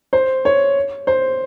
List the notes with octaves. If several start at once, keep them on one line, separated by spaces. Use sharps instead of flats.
C5
C#5
C5